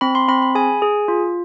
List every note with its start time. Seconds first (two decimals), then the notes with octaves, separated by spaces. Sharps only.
0.01 C4 B5
0.15 C6
0.28 C4 B5
0.42 B5
0.55 G#4 G#5
0.82 G#4
1.08 F4